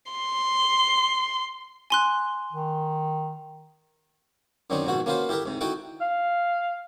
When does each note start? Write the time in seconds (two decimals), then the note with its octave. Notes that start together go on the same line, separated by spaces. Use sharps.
0.12 C6
1.90 G#5 C6 F#6
2.52 D#3
4.70 F#2 F#3 C4 D4 D#4
4.87 A#1 G#2 B2 F#4 F#5
5.06 A#3 C#4 F4 F#4 B4 C5
5.29 E4 G4 A4 A#4 E5
5.46 G#2 C3
5.61 D#4 E4 F#4 A4 F#5 G5
6.01 F5